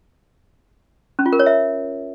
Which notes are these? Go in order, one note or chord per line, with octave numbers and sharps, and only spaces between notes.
C#4
F4
A#4
C#5
E5